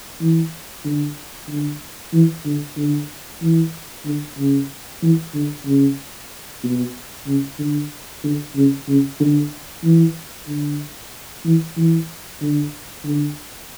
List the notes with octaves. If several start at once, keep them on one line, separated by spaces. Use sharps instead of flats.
E3
D3
D3
E3
D3
D3
E3
D3
C#3
E3
D3
C#3
B2
C#3
D3
D3
C#3
C#3
D3
E3
D3
E3
E3
D3
D3